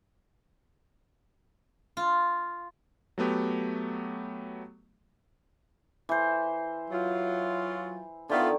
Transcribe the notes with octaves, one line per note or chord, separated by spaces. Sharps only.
F4
F#3 A3 B3 G4
E3 C5
F#3 F4
D3 D#3 B3 E4 F4